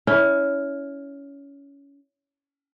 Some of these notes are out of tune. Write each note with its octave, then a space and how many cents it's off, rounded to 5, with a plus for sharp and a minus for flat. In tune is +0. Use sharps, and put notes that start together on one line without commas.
C#4 +20 E4 -10